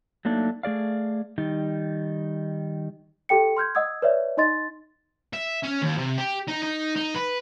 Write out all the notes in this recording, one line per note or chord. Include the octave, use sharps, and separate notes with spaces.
F#3 A3 A#3 D4 D#4
A3 G#4 D5 F5
D#3 G3 D#4
G4 A4 G5 C#7
C6 F6 G6 G#6
D#5 F#5 D#6 E6 G#6
B4 C#5 D5 E5
D#4 D#5 C6 A6
E5
C#4
D#2
C3
G4
D#4
D#4
D#4
B4